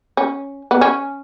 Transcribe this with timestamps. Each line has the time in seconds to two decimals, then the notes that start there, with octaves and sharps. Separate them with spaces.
0.17 C#4
0.71 B3
0.81 C#4